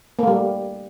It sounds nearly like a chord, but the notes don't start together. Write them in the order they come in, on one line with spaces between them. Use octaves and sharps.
A#3 A3 G3